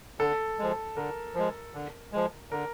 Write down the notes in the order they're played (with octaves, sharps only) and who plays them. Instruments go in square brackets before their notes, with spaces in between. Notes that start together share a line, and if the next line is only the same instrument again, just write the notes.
[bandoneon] D3 [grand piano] A4
[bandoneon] F3 G#3
[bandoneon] D3 [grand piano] A#4
[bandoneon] F3 G#3
D3
F3 G#3
[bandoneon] D3 [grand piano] A#4